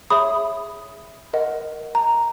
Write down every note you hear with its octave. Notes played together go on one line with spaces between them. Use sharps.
G#4 C#5 E5 B5 D#6
A#4 D#5 F#5
A#5